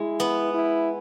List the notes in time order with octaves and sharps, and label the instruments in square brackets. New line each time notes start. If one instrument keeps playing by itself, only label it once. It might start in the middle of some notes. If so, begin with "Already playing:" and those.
Already playing: [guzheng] G#3 [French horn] E4
[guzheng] B3
[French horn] E4